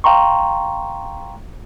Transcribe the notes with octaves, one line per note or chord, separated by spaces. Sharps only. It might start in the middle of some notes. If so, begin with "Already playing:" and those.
F5 G5 A#5 C6 C#6